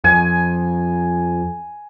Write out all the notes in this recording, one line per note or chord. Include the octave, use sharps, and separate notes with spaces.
F2 G#5